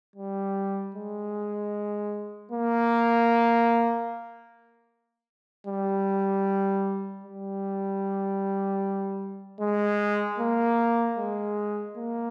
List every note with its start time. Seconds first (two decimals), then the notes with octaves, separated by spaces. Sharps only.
0.16 G3
0.95 G#3
2.52 A#3
5.67 G3
7.24 G3
9.60 G#3
10.38 A#3
11.18 G#3
11.97 A#3